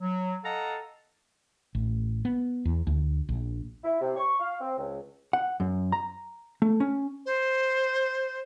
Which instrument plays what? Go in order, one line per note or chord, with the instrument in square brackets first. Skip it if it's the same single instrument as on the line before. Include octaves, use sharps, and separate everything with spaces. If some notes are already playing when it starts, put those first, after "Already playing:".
[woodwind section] F#3
A4 D#5 F5 F#5 A5 A#5
[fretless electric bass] A1
B3
E2
D2
A#1
[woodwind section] E4
C3
C#6
F5
C4
C#2
[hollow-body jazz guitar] F#5
F#2
A#5
A3
C#4
[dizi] C5